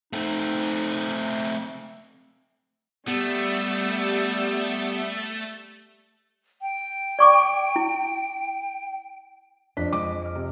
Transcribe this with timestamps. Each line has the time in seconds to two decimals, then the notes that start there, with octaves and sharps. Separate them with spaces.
0.13 A3 C4 D#4
3.08 G3 A3 B3 E6
6.62 G5
7.19 D5 C#6 D6
7.76 E4
9.77 F2 D4 B6
9.93 G#3 D6
10.22 F6 D7
10.35 C3